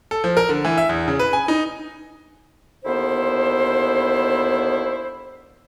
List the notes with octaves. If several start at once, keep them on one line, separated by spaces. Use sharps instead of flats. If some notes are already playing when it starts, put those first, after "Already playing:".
A4
F3
A#4
D3
E3
E5
E2
C#3
B4
G#5
D#4
D#2 D3 B3 E4 C5